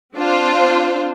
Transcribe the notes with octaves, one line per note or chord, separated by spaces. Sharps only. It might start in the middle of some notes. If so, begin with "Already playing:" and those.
C4 D4 F4 C5